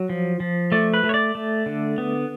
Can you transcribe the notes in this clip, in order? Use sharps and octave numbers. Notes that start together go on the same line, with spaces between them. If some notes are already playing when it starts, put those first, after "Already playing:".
Already playing: F#3
F3
F3
A3 D5
B4
A3
C#5
D5
A3
D3
B3